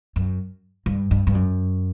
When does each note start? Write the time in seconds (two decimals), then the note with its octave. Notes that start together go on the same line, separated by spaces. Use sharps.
0.16 F#2
0.86 G2
1.11 G2
1.27 G2
1.35 F#2